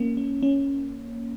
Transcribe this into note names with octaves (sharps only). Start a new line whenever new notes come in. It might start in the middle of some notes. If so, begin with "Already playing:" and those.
Already playing: A#3 C#4
C#4
C#4